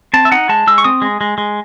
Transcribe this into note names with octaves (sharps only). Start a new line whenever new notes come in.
C4 A5
E5
D#4 F#5
G#3 A5
G#3 E6
C#6
C4 D#6
G#3
G#3
G#3